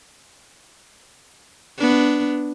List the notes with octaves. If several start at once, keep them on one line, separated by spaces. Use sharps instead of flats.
B3 D4